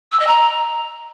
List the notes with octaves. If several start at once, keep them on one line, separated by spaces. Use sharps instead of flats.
E6
D#5
A#5